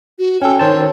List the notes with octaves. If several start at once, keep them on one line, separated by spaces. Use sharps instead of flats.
F#4
C#4 A4 G5
D#3 C5 C#5 A5